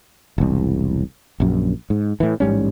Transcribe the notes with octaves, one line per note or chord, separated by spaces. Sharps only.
E1 C2
A#1 F#2
G#2
A2 E3
A1 G#2 G3 C#4